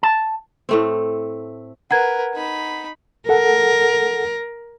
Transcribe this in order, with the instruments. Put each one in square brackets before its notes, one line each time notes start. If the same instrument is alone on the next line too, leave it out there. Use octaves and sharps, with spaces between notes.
[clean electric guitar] A5
[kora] A2 A3 C4
[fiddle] A#4 B4 [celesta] F#5 A#5 G#6
[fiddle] D#4 B5
[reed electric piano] A4 F#5 [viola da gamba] A#4